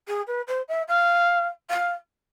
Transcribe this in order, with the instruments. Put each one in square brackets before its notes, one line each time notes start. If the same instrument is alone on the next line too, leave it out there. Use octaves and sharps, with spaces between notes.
[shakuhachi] G#4
B4
C5
E5
F5
F5